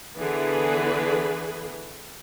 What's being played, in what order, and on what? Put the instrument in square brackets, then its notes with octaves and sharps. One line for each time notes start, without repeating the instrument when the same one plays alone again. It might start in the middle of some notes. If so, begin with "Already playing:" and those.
[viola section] D3 E3 B3 G#4 B4